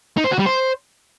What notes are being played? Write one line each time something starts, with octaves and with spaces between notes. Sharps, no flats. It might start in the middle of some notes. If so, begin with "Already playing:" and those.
D#4
C5
F#4
G3
C5